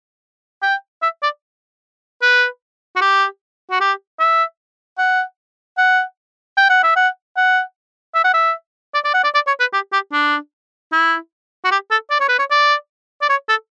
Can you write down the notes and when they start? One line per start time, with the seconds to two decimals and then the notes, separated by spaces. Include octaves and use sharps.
0.62 G5
1.02 E5
1.22 D5
2.22 B4
2.96 F#4
3.01 G4
3.70 F#4
3.80 G4
4.20 E5
4.98 F#5
5.78 F#5
6.57 G5
6.69 F#5
6.83 E5
6.96 F#5
7.36 F#5
8.14 E5
8.24 F#5
8.33 E5
8.94 D5
9.04 D5
9.14 F#5
9.24 D5
9.34 D5
9.47 C#5
9.60 B4
9.73 G4
9.93 G4
10.12 D4
10.92 E4
11.64 F#4
11.71 G4
11.91 A4
12.10 D5
12.20 C#5
12.28 B4
12.39 C#5
12.50 D5
13.22 D5
13.29 C#5
13.49 A4